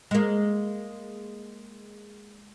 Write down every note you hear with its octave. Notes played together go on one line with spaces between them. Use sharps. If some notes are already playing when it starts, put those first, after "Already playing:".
G#3 A#3